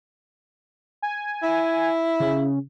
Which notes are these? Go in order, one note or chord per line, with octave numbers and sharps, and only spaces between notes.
G#5
E4
C#3